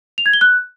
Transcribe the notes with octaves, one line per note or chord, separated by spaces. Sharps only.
F7
G#6
G7
F#6